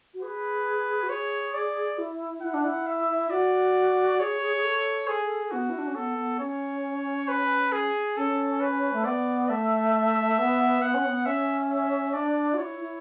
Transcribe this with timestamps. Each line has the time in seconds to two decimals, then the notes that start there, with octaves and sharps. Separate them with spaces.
0.14 F#4
0.22 G#4 B4
1.02 F#4
1.09 G#4 C#5
1.54 D5
1.98 E4
2.42 E4 F#5
2.53 D4
2.64 E4
2.87 E5
3.30 F#4 D5
4.19 G#4 C#5
4.41 G#4
4.56 G#4
4.63 A4
5.08 G#4
5.51 B3 F#4
5.69 E4
5.78 D4
5.86 C#4
5.95 B3 A4
6.17 B3
6.39 C#4 C#5
7.28 B4
7.72 G#4
8.16 C#4 A4
8.61 B4
8.92 A3
9.04 B3 D5
9.49 A3 E5
9.94 E5
10.38 B3
10.82 B3 F#5
10.94 C#4
11.05 B3
11.26 C#4 E5
11.70 E5
12.13 D4 D5
12.54 F#4
12.57 E4 C#5
12.80 E4